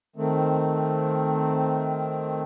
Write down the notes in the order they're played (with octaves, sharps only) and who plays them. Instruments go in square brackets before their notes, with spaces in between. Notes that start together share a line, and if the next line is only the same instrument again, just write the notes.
[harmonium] D#3 A3 C4